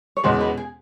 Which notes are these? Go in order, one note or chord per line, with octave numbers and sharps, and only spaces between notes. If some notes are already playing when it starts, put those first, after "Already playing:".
C#5
E2 B2 G#3 C#4 C5
B4
G#4